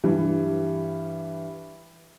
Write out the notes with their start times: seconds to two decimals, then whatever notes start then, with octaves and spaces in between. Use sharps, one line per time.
0.04 G2 E3 G3